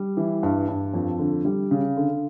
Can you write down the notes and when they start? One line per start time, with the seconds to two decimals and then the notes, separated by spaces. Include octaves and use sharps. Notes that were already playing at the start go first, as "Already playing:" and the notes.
Already playing: G3
0.17 E3
0.43 G2
0.68 G2
0.94 F2
1.19 D3
1.45 G3
1.71 C#3
1.97 D3